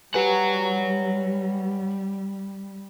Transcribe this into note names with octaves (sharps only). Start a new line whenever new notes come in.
G3 G4 B4 C#5 F#5 G#5